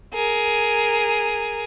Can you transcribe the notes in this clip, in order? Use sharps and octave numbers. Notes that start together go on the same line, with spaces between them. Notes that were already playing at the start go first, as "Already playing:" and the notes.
G#4 A#4